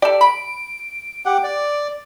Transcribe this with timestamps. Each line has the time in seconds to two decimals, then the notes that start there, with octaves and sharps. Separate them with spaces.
0.02 G4 A4 D5
0.21 B5 D7
1.26 G4 F#5
1.43 D5